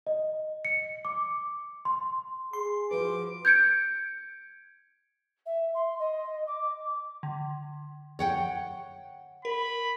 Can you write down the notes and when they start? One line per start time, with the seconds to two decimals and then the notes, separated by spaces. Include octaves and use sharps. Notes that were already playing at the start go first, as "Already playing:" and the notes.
0.07 D#5
0.65 C#7
1.05 D6
1.85 C6
2.53 G#4 C6
2.91 F3 F#4 B4 D6
3.45 G6 G#6 C#7 D7
5.46 E5
5.75 C6
5.99 D#5
6.47 D6
7.23 D3
8.19 C#5 F#5 G5
9.45 A#4 B5